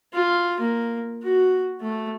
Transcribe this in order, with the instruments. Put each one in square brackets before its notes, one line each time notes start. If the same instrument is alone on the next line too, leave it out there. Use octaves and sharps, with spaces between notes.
[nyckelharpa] F4
A#3
F#4
A3